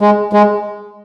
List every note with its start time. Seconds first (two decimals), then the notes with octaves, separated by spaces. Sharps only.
0.01 G#3
0.33 G#3